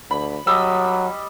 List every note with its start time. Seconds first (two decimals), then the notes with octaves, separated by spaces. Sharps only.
0.11 D2 B5
0.47 F#3 G3 D#5 E6